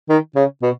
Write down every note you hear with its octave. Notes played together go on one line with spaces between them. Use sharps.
D#3
C#3
B2